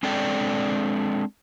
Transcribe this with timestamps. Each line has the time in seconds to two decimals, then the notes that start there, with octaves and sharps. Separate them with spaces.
0.03 G#3 C4 D4 A4 D5 G5